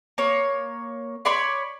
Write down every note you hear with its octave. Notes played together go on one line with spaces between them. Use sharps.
A#3 C#5
C#5 D5 B5 C6